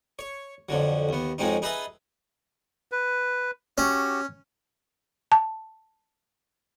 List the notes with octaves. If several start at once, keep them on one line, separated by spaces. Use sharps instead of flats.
C#5
F2 D3 F#3
D#2 B3
F2 F#3 G#3 C4 D#4
D#4 G#4 B4 D#5 E5 A5
B4
C#4 F#4 G4
A5